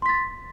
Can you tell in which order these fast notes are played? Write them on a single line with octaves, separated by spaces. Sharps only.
C6 B6 A6